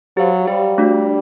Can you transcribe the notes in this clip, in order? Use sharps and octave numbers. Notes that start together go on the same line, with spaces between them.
F#3 G4 C5 F5
G3 G4 C5 F5
A3 D4 F#4